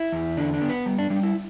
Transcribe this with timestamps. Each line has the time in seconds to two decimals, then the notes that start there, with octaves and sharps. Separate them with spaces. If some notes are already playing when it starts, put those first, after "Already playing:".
Already playing: E4
0.12 E2
0.37 D3 D4
0.54 D4
0.62 B3
0.70 B4
0.86 G3
0.99 D4
1.10 G3 D4
1.23 E4